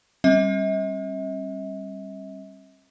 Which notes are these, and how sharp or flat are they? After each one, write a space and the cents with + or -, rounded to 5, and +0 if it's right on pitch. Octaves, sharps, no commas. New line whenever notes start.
G3 +0 C4 +45 E5 -45